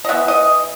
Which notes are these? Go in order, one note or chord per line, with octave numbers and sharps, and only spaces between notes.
D#5
E3 B3 E5
D#5